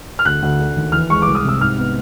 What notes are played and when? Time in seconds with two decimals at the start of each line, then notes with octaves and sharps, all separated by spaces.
0.19 F6
0.25 D2 F#6
0.42 D2
0.59 D3
0.76 D#2
0.92 E3 F6
1.10 G#3 C#6
1.22 C2 D6
1.35 D#6
1.44 C3 E6
1.60 G#2 F6
1.78 B3